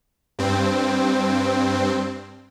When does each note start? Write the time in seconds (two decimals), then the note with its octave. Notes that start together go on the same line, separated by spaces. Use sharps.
0.39 G2 C4